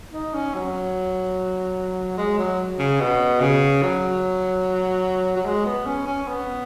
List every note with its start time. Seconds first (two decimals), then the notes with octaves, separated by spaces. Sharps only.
0.13 D#4
0.34 C#4
0.54 F#3
2.18 G#3
2.39 F#3
2.79 C#3
3.00 B2
3.41 C#3
3.82 F#3
5.36 F#3
5.46 G#3
5.66 B3
5.86 C#4
6.07 C#4
6.28 B3